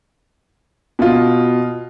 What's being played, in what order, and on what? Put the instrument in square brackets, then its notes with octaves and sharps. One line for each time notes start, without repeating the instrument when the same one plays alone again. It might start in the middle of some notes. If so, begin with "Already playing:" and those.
[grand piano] B2 F4